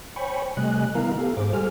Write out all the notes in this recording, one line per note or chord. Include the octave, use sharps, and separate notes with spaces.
C5 C#5 G5 G#5 B5 C#6
C3 G3 A3 D#5 G#5 F#6
D#3 B3 E4 A#4 F5 A#5
B3 G4 A4 F5
G#2 G#4 C5 D6
G3 G4 A4 C5 G#5 F6